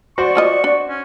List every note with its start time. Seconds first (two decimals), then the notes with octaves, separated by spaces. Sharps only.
0.18 F#4 C5 D5 C#6
0.35 F3 F4 D#5
0.64 D4
0.89 C#4